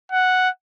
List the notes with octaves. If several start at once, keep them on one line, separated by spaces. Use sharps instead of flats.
F#5